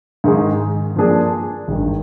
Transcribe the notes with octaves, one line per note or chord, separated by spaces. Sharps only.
G#2 D#3 G#3
G2 F3 A#3 D4 G#4
G#1 G2 D#3